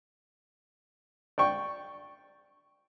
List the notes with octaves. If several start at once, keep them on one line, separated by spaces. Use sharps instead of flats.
D5 G5 C#6